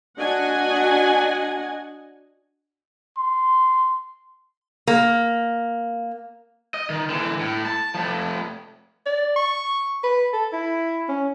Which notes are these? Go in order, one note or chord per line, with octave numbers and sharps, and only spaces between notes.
D4 F#4 D#5 F#5 G#5
C6
A#3
D#5
D#3
D3 E3
A2
A5
F3 A3
D5
C#6
B4
A4
E4
C#4